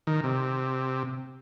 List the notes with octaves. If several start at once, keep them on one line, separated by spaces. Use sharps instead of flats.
D#3
C3